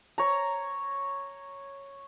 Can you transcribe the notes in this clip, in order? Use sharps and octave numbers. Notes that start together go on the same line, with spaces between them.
C#5 A#5